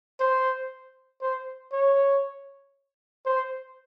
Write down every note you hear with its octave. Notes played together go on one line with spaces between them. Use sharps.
C5
C5
C#5
C5